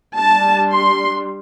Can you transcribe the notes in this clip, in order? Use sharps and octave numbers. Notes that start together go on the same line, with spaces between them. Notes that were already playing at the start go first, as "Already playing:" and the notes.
G3 D4 A5
C6